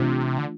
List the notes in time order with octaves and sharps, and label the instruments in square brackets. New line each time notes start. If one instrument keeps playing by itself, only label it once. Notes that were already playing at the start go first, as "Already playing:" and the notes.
Already playing: [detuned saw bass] C3 [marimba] E3 A3 D4 F4
[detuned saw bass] D3